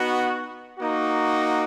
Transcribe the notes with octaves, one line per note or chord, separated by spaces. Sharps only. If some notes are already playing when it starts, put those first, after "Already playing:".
Already playing: B3 D#4 F#4
A#3 D#4 F#4